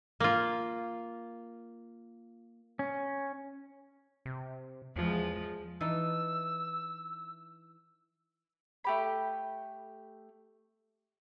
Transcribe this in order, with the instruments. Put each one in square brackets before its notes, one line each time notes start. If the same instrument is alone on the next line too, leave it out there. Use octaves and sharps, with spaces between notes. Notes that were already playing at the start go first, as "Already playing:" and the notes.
[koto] A#3 F4
[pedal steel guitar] C#4
[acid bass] C3
[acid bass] E2 [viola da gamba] F3 G#3
[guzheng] E3 D#4 A5 [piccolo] E6
[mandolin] A3 G4 B5